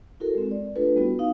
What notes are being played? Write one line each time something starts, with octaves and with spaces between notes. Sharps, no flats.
E4 F#4 A4 A#4
G#3 C4
D5
A3 D4 F4 A4 B4
G3 B3 E4 F#4
B3 D#4 F5